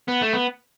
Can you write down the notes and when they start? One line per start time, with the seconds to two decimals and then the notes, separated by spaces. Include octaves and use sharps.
0.08 B3
0.22 A3
0.33 B3